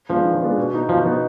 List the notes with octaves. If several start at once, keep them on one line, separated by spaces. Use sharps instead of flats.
F3 G#3 B3 D4 F4
D#3
G#3 B3 D4 F4
B2
B3 D#4
B2 F3
B3 D#4